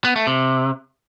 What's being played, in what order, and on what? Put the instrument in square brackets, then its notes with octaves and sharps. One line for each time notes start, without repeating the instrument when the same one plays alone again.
[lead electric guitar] B3
A3
C3